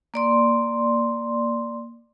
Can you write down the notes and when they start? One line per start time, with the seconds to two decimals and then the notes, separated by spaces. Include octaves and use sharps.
0.14 A#3 D5 C6